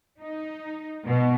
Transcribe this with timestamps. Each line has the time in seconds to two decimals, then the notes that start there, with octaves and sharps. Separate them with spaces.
0.19 D#4
1.05 B2